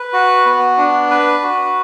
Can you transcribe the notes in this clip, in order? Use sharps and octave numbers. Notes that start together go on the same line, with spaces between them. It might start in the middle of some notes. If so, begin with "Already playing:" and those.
Already playing: B4
F#4
B3
D4
B4
F#4